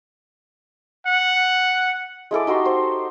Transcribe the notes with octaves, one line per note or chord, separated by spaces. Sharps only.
F#5
G#3 E4 A4 D6
D#4 F#4 G4 C6
C5